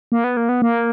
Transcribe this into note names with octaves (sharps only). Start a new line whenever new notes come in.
A#3
B3
A#3
B3
A#3